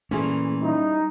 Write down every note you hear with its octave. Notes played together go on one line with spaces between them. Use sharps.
A#2 E3 A3 C#4 G#4
G3 D#4 E4